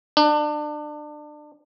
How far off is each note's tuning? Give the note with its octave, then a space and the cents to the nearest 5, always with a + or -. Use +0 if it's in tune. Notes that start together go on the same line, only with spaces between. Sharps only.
D4 +30